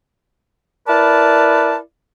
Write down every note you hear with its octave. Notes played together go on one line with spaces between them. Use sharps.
E4 A#4 B4 D5 A5